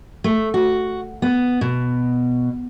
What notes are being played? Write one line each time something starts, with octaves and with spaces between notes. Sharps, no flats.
A3
F#4
B3
B2